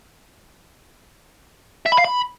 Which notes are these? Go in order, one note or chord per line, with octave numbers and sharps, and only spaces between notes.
E5
B5
F5
B5